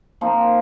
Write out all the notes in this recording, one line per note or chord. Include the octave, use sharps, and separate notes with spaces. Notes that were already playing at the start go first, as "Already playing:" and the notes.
A#2 F3 C4 D#4